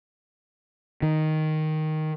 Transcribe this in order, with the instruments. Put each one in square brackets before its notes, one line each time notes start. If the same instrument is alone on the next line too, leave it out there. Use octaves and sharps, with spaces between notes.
[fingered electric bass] D#3